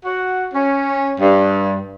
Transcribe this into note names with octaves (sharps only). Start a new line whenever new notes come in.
F#4
C#4
G2